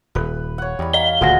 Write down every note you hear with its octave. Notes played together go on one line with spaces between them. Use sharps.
D#1 B4
C#5 F#5
E2 G3 B5
D#5 F5 A#5 G7
D#1 D2 A#2 F4 F#4 G#4 F#5 A#6